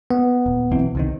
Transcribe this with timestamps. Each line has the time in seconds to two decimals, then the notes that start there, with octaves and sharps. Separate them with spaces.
0.11 B3
0.46 D#1
0.71 B1 E3 C4
0.95 C2 C3 D#3